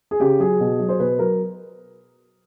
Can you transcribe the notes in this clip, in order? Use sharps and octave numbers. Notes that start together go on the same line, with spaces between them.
G#4
C#3 G4
F#3 G#4
B2
F#3
C5
B2 B4
F#3 A#4